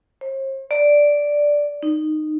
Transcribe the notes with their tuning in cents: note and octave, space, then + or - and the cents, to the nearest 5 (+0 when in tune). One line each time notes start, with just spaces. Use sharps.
C5 +45
D5 -5
D#4 -15